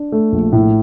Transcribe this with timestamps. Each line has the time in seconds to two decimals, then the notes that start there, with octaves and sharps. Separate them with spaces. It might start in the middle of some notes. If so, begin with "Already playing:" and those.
Already playing: D4
0.12 A3
0.32 A#1
0.52 A2